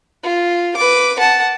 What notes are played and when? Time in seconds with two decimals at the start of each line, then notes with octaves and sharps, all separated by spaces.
0.23 F4
0.77 B4 D6
1.19 F#5 A5